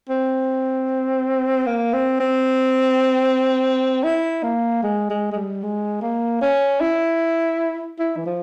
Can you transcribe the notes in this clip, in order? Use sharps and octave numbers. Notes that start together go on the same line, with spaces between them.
C4
A#3
C4
C4
E4
A#3
G#3
G#3
G#3
G3
G#3
A#3
C#4
E4
E4
E3
F3